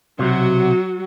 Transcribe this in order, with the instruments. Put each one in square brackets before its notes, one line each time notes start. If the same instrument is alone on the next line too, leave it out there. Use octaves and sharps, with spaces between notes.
[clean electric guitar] B1 C3 [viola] F#3 F#4